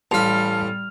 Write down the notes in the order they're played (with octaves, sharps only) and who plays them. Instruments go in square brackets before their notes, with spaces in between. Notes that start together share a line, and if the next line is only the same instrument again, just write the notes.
[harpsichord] A1 F5 [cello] G3 [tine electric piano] A5 [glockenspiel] F6 F7